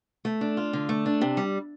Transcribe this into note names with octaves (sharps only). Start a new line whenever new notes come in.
A3
D4
F4
D3
A3
D4
C3
G3